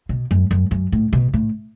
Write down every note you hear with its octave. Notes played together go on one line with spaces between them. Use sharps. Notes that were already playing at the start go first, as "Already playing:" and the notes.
B2
F#2
F#2
F#2
A2
B2
A2